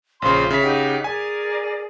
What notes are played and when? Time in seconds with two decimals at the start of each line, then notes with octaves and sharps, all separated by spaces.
0.22 A#1 C#3 F4 C5 C6
0.50 C#3 E5 B6
0.63 D#4 G4 F#5
1.04 G#4 A#4 D5 G#5